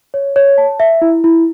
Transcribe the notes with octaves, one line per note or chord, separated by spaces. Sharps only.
C#5
C#5
A5
E5
E4
E4